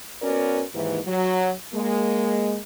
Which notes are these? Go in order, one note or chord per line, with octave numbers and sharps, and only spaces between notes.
B3 C#4 F#4 A#4 B4 D5
D#2 G#2 E3
F#3
G#3 A#3